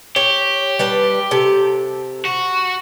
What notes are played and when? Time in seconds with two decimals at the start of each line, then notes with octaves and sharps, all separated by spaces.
0.16 G4 C#5
0.79 G3 B4 A5
1.31 C3 A4
2.25 F#4